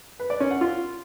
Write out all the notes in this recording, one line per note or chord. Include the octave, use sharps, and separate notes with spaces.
B4
D5
C#4
F#5
F4